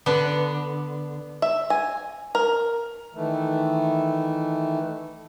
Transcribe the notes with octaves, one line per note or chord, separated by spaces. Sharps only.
D3 B3
E5
G#5
A#4
D#3 E3 A3